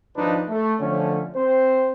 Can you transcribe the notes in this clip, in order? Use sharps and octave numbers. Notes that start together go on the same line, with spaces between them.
G#1 F3 D4 D#4 B4
A3
D3 F3 A3 C#4
C4 C5